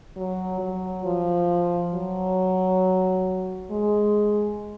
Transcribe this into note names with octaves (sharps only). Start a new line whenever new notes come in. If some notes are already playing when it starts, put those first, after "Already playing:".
F#3
F#3
F3
F#3
G#3